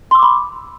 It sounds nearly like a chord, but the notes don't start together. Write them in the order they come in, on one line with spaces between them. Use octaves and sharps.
C6 E6 D6 B5